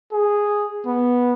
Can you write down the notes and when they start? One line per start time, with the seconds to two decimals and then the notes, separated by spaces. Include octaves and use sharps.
0.12 G#4
0.86 B3